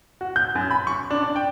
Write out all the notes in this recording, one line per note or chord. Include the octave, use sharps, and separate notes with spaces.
F#4
G6
F#2
B5
C#6
D4
D5
G5